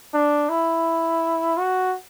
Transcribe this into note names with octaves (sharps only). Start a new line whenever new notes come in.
D4
E4
F#4